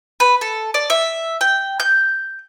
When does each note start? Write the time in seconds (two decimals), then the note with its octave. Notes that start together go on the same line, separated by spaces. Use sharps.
0.20 B4
0.41 A4
0.74 D5
0.90 E5
1.41 G5
1.80 G6